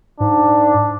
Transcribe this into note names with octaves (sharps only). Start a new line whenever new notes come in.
G#2 D4